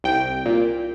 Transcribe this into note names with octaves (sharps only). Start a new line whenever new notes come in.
C2 G5
A#2